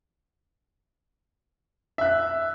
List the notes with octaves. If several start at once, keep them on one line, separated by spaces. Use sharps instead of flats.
E5 F#6